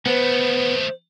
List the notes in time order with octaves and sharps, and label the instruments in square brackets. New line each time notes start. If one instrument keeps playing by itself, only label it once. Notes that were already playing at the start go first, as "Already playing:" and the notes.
[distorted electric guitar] D#3 A3 [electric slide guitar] B3 [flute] C5